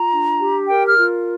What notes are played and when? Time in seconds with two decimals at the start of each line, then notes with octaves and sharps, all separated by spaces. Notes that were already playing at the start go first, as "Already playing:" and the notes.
Already playing: F4 A#5
0.11 D4
0.40 G4
0.68 A#4 G5
0.88 F6
0.97 F4